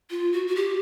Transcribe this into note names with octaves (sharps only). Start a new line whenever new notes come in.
F4
F#4
F#4
G4